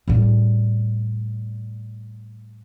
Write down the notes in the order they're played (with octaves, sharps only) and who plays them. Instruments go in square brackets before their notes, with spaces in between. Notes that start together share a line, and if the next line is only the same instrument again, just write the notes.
[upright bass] A2 G3